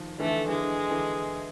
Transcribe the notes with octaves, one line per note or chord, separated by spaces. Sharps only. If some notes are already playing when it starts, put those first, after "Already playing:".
Already playing: D#3 F3
D3 E3 A3
D3 E3 G#3
D3
D3 E3